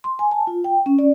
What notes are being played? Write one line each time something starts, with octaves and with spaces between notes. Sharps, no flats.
C6
G#5
A5
F4
G5
C#4
D5